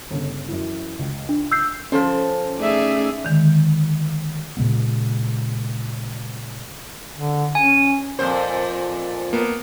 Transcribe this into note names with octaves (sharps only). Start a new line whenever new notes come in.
G1 C#3
F#2 E3
C#2
D4
E6 G6 C7
F3 C#4 A4 C5
A3 D#4 G#4 D5 E5
D3 D#3 G#3
A#2 C#3 G#3 B3
D3
C#4 G#5
F2 A#2 C5
A#3 B3